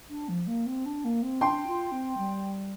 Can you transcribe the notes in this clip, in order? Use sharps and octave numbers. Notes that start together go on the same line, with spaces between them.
D4
F3
A#3
C4
D4
A#3
C4
D4 G5 C6
F4
C4
G3